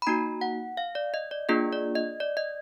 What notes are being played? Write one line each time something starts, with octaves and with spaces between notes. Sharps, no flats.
B5
A#3 D#4 F#4 A#5
F#5
F5
D5
D#5
D5
A#3 D4 F4 G#4 D#5
D5
D#5
D5
D#5